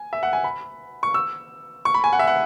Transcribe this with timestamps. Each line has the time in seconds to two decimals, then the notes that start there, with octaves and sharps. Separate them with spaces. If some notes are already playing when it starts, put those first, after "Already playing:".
Already playing: G#5
0.13 E5
0.23 F#5
0.33 G#5
0.44 B5
1.03 C#6
1.14 E6
1.85 C#6
1.94 B5
2.04 G#5
2.13 F#5
2.19 E5
2.27 F#5